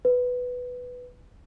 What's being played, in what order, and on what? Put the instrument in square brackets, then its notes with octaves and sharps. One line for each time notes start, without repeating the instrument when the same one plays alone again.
[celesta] B4